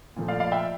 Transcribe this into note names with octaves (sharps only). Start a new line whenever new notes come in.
A#2 F3 A3
D5 F5
D5 F5
E5 G5